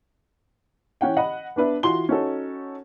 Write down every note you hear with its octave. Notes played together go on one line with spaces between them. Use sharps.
E3 C#4 F#5 G5
D#5 F#5 B5
B3 D4 B4 E5
E3 F4 F#4 C6 G7
C#4 D#4 F#4 A4